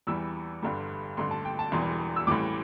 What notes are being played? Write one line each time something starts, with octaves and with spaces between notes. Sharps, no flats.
E2 E3 G3 E6
G1 G2 D3 G3
A1 G2 D3 C6
A5
G5
A5
E1 E2 E3 G3 C6
E6
A1 A2 E3 G3 D6